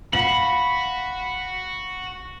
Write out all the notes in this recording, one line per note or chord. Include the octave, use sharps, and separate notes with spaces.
F#4 F5 F#5 B5 F#7